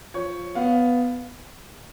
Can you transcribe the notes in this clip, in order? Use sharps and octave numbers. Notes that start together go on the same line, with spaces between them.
F3 C#5
B3 F5